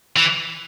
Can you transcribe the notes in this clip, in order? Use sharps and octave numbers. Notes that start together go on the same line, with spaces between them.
E3